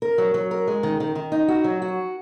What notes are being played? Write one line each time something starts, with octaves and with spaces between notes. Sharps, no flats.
A#4
F#3
F#3
A#4
G#3
D#3
D#3
D#3
D#4
F#4
F#3
F#4